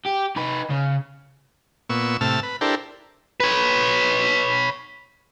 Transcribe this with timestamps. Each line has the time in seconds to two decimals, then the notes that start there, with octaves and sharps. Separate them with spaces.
0.06 G4
0.36 D#4 B4
0.70 C#3
1.90 A#2 B3 C#6 E6
2.21 A2 C3 A5 E6 F6
2.43 B4
2.61 D4 E4 G4 A4 A#4 C5
3.40 B4 C#5